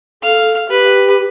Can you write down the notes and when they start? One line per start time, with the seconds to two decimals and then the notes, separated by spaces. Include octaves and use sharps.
0.23 A4 F5 F6
0.69 G4 B4